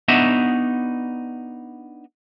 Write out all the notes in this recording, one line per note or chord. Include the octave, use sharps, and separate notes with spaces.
B3 D4 D#4 F#4 D#5 E5